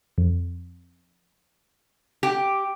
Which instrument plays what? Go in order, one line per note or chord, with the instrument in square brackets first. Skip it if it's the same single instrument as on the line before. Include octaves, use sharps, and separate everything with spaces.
[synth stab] F2
[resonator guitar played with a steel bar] G4